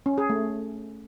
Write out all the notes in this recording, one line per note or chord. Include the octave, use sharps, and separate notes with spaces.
C#4
G#4
A3